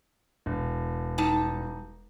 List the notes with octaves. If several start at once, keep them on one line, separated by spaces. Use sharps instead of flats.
E1
G3 D#4 A5